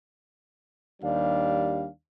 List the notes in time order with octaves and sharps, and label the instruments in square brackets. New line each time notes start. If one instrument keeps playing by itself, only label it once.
[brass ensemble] D#2 G3 D4 F5